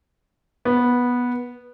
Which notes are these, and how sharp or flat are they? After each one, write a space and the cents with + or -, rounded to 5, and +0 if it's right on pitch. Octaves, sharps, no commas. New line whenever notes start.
B3 -10